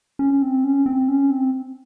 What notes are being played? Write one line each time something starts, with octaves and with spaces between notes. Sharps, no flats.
C#4
C4
C#4
C4
C#4
C4